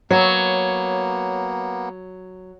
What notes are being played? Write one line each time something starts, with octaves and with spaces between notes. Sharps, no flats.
F#3 A#3 B3 C#5